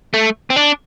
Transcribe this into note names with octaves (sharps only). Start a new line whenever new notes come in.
A3
C4
D4